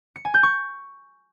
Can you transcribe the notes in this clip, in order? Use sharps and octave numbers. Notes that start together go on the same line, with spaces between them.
C#7
G#5
G6
C#6